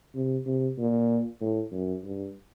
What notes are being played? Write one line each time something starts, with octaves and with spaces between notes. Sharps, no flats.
C3
C3
A#2
A2
F#2
G2